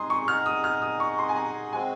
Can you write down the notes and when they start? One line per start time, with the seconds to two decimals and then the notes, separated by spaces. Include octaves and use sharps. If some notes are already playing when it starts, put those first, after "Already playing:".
Already playing: G#3 D#4 G#4 C6
0.10 C#6
0.28 D#4 G#4 D#5 F#5 F6
0.46 D#6
0.64 F6
0.82 D#6
1.00 C#6
1.19 C6
1.29 G#5
1.36 A#5
1.73 G#3 C4 F#4 G#5